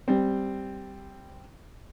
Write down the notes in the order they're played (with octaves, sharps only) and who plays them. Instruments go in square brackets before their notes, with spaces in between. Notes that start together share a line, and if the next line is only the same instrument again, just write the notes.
[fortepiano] G3 C4